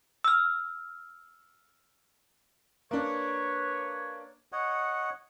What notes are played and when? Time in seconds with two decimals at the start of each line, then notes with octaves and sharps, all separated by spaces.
0.24 E6 F6
2.91 A#3 D4 B4 C#5
4.52 C#5 D#5 F#5